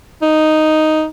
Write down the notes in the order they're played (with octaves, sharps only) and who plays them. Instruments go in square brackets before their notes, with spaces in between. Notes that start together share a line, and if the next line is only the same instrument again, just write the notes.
[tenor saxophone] D#4